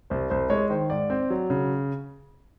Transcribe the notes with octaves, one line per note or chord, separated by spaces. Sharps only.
C2 C5
C2 C5
G#3 C#5
D#3 C5
G#2 D5
C4
F#3
C#3